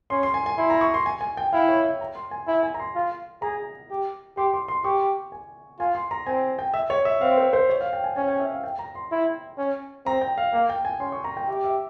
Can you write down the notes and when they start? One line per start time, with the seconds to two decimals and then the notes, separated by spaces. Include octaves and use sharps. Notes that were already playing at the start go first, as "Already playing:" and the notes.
0.10 C#4 C6
0.23 C6
0.34 G#5
0.46 G#5
0.58 E4 C6
0.70 A#5
0.81 C#6
0.94 C6
1.06 G#5
1.21 G#5
1.37 G5
1.53 E4 F5
1.69 C#5
1.84 E5
2.01 A#5
2.15 C6
2.31 G#5
2.47 E4 G#5
2.63 G#5
2.74 A#5
2.79 C6
2.95 F4
3.42 G#4 A#5
3.90 G4
4.37 G4 C6
4.54 C6
4.68 C6
4.84 G4 C#6
5.32 G#5
5.79 F4 G#5
5.95 C6
6.11 A#5
6.26 C4 G#5
6.59 G5
6.74 E5
6.90 C#5
7.05 E5
7.21 C4 F5
7.37 C5
7.53 C5
7.70 C#5
7.81 F5
7.93 G5
8.04 G#5
8.16 C#4 G#5
8.28 G5
8.40 E5
8.52 F5
8.64 G5
8.79 A#5
8.95 C6
9.12 E4
9.58 C#4
10.06 C4 A#5
10.21 G5
10.38 F5
10.53 A#3 F5
10.69 G5
10.85 G#5
11.00 C#4 C6
11.12 C#6
11.24 A#5
11.37 G5
11.48 G4 E5
11.64 E5